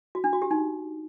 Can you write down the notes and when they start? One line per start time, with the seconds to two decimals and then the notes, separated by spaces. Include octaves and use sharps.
0.15 F#4
0.24 D4
0.33 F#4
0.42 G4
0.51 D#4